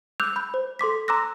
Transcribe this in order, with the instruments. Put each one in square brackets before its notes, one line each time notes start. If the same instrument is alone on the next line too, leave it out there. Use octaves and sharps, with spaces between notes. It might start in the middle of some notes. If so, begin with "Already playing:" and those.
[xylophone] D6 E6 F#6 G6 F7
B5 G6
C5
A4 C6 D6 B6
A#5 C6 D6 E6 F#6 A#6